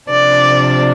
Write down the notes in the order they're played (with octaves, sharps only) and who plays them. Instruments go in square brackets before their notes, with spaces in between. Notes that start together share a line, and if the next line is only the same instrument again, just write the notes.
[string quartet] C3 F3 D4 D5